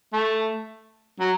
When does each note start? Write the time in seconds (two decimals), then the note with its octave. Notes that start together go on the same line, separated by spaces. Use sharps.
0.13 A3
1.20 F#3